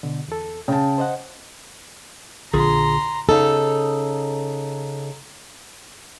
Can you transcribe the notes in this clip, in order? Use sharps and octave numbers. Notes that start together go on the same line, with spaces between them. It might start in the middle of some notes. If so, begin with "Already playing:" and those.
B2 D3
E2 A4
C#3 G5 A5
C5 D#5 F#5
A#1 D3 F4 G#4 A#5 C6
C#3 D#4 A4